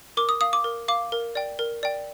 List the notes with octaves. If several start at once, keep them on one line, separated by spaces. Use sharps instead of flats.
A#4 D6
D#6
F5 D#6
D6
A#4
F5 D6
A#4
D5 G5
A#4
D5 G5